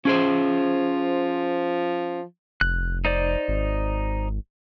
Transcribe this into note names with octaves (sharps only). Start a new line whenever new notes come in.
F3 C#4 G#4 C5
F1 F#6
D#4 C5 D5
G#1